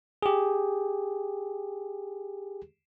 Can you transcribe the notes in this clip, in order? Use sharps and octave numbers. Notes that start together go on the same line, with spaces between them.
G4 G#4